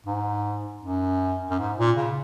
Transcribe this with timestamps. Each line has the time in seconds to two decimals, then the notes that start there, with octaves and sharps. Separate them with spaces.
0.06 G#2
0.82 F#2
1.50 F#2
1.59 G#2
1.78 A#2
1.96 C#3